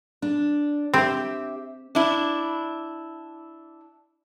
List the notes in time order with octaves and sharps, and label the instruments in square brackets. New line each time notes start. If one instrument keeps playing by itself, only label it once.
[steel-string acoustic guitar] D4
[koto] C4 [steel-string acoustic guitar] G4 E5
[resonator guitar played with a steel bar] D4 E4